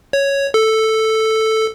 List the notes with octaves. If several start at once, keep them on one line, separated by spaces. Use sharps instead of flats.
C#5
A4